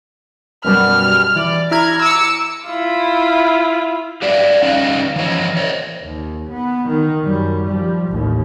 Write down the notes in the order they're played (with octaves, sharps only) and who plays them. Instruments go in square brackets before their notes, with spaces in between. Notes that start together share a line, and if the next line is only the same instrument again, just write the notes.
[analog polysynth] F#2 B2 G3 [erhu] F6
[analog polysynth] E3 D5
[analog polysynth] E4 F6 G#6 [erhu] A#5
[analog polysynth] D6 C#7 [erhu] E6
[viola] E4 F4
[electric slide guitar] G4 B4 D5 E5 F5
C#4 D#4 B4 D#5 F5
E3 F3 C#5 D#5
C5 C#5 D#5
[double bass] D#2
B3
D#3
F#2 G3
F3 G3
A1 D#2